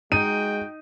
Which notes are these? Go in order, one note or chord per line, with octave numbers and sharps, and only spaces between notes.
G#3 D#4 F#4 G5 D#7